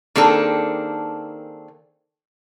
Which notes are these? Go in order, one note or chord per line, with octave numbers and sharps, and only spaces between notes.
D#3 A#3 C4 D4 G#4 A4